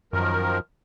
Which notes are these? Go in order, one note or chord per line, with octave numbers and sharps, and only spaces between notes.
F#2 D#3 F3 A#4